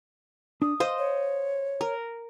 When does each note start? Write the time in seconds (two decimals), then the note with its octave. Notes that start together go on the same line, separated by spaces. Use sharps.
0.62 D4 D#6
0.80 C5 D#5 F5
0.98 C#5
1.81 A#4